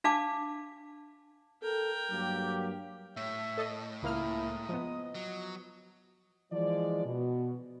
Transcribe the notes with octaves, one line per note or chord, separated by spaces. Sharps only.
D4 F5 A5 D6
A4 A#4 G5
G2 F#3 A#3 G4
A2 C#5 E5
A4 D#5
C#2 G#3 A#3 E4 A#5 D#6 F6
F3 B3 D#5
F#3
E3 F3 G#3 D5
B2